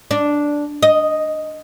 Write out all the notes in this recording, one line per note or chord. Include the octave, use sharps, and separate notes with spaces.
D4
D#5